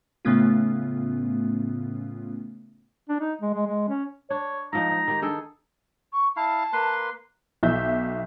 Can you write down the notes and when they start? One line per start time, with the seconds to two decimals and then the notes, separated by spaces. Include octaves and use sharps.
0.25 A2 C#3 A3 B3 C#4 F4
3.09 D4
3.21 D#4
3.41 G#3
3.54 G#3
3.67 G#3
3.89 C#4
4.30 D4 C#5
4.73 G#2 F3 D#4 A#5
4.91 D#4
5.08 D#3 G4
5.22 D4 G#4 A4 G5
6.13 C#6
6.36 E4 F5 A5
6.73 A#3 B4 C6
7.63 B1 E5 G6